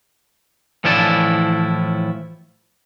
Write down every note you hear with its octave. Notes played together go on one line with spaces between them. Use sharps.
A2 E3 F3 E4 D5 A5